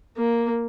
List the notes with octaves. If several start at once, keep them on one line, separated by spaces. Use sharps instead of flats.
A#3